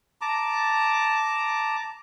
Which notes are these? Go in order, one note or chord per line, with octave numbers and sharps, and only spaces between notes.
A5 A#5 D6